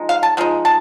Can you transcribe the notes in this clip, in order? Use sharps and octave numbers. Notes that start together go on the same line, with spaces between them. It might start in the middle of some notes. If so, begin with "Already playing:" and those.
Already playing: F3 G#3 D#4
F5
A5
F3 G#3 D#4
A5